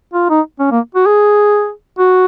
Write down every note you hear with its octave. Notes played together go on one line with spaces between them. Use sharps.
F4
D#4
C#4
A#3
F#4
G#4
F#4